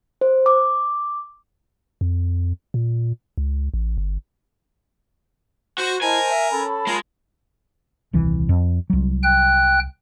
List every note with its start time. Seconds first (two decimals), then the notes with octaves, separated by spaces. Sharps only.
0.21 C5
0.46 D6
2.01 F2
2.74 A#2
3.38 C#2
3.74 A1
3.98 G1
5.78 F#4 C5
6.02 E4 A#4 C5 D#5 G#5 A5
6.29 E5
6.51 C#4 A4 A5 B5
6.87 G#3 F4 A#4
8.13 D#1 C2 E3
8.49 F2
8.90 C2 F#3
9.24 G5 F#6